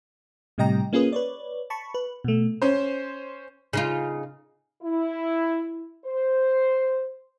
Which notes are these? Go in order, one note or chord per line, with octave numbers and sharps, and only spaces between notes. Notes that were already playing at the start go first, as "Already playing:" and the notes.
A2 C3 G3 D#5 G5 A#5
A#3 C#4 F4 G#4 B4 D#6
B4 C#5 D5
A5 B5 C#6
B4
B2 A3
C#4 C5
C#3 D#4 F4
E4
C5